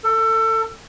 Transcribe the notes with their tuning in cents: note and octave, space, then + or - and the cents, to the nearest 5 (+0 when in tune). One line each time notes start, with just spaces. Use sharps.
A4 +25